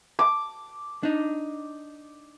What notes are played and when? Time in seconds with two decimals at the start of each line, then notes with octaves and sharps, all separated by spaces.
0.19 D6
1.03 D4 D#4